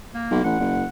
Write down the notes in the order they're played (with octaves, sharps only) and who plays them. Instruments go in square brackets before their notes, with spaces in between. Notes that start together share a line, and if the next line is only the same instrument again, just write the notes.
[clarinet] A#3
[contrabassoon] B1
[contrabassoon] A1 [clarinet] F#5
[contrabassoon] F#1